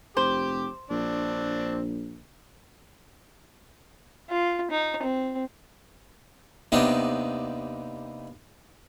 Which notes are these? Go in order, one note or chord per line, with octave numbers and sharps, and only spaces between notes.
F1 G4 C5 D6
A#1 C4 D4
F4
D#4
C4
D#2 C3 B3 D4 D#4 D#5